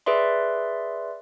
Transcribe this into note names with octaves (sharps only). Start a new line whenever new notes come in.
G#4 B4 D5 E5 C6